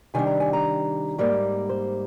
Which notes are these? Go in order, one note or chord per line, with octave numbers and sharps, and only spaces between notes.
C3 D#3 G3 D4 G#5
A#5
G#5
A#5
G#2 G3 A#3
C5